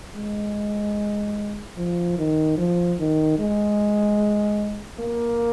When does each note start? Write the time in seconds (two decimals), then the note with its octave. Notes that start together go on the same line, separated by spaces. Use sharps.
0.15 G#3
1.77 F3
2.18 D#3
2.58 F3
2.99 D#3
3.39 G#3
5.00 A#3